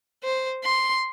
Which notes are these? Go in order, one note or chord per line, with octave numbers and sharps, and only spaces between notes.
C5
C6